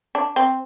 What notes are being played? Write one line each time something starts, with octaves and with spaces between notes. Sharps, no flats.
D4
C4